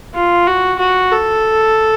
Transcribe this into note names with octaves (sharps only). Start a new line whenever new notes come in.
F4
F#4
F#4
A4